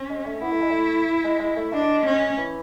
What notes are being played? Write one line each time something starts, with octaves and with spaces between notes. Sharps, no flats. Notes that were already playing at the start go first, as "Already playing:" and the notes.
Already playing: C#4
G#3
A3
B3 E4
A3
G#3
A3
G#3
G#3
A3
G#3 D4
C#4
E3